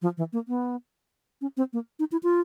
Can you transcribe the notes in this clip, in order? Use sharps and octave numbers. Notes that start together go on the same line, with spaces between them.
F3
E3
A#3
B3
C#4
C4
A#3
D#4
E4
F4